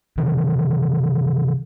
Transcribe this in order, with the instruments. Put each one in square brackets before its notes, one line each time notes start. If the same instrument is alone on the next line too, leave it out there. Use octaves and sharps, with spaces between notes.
[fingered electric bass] C3 D#3 E3